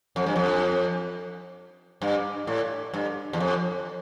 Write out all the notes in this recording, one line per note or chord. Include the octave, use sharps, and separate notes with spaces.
F2
G2
F2
G2
A2
G2
E2
F2